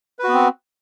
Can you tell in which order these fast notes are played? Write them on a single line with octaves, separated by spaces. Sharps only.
B4 F#4 B3 C4